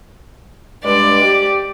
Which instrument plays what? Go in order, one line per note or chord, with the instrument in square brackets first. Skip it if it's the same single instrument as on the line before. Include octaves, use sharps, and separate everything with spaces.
[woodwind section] G2 G#3 [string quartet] D5
[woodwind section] G4